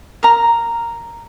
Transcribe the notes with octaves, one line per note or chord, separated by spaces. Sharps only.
A#4 A#5